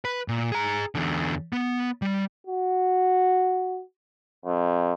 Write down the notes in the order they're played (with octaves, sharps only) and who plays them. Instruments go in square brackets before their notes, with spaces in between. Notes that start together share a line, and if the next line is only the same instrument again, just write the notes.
[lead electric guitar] B4
A#2
G#4 A#5
E2 D3
B3
G3
[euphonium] F#4
F2